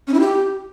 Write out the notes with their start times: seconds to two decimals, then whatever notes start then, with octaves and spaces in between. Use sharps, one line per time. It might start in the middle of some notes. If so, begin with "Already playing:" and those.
0.07 C#4
0.14 E4
0.20 G4